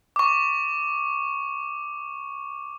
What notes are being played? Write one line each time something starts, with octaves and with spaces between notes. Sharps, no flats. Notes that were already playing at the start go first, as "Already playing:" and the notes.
C#6 D6